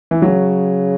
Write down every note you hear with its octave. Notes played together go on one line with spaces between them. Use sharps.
E3
C#3 F#3